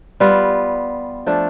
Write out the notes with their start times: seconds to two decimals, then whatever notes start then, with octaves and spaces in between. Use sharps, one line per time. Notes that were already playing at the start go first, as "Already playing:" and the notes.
0.20 G3 B3 F4
1.26 F3 A3 D4